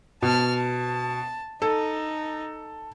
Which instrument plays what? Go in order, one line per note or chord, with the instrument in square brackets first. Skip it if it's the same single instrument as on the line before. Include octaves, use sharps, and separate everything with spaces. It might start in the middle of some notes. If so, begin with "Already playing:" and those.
[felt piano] B2 [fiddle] A5 F6
[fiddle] A5
[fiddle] D#4 [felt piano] A4